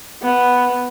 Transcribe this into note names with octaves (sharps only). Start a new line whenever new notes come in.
B3